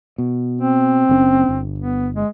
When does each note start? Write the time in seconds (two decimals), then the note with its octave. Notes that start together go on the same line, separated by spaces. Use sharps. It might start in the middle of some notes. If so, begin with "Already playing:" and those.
0.18 B2
0.61 C4
1.09 F#1 C#3 C#4
1.49 G1
1.79 B3
2.16 G#3